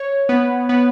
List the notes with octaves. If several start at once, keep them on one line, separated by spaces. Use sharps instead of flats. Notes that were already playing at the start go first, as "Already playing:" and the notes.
Already playing: C#5
B3
B3